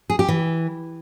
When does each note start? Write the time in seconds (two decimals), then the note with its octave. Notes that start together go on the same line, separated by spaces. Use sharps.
0.10 G#4
0.19 G4
0.28 E3